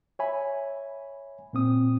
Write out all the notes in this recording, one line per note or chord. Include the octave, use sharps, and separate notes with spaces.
C#5 E5 G#5 B5
A#2 C4 D#6